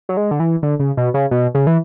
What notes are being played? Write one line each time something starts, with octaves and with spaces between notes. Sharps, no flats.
F#3
G#3
D3
E3
D3
C#3
B2
C#3
B2
C#3
E3